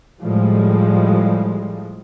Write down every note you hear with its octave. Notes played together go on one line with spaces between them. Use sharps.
A2 F3 G3 G#3